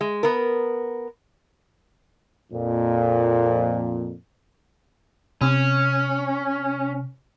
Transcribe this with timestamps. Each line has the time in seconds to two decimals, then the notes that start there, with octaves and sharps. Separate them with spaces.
0.01 G#3
0.23 B3 A#4
2.53 F2 A#2
5.41 C3 C#4